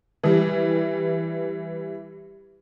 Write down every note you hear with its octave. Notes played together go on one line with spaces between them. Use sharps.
E3 G3